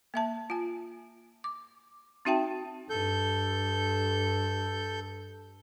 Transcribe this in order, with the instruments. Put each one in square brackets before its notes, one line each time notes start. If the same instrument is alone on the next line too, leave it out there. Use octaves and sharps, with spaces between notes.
[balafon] A#3 E5 A5
F4 G#5
D6
C4 D#4 F#4 E5 G5 A5
[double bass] G2 [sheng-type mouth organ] A4 G6